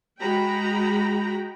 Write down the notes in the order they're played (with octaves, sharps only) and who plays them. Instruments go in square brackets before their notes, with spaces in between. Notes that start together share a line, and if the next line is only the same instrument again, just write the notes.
[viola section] G#3 F#4 G5 A#5 B5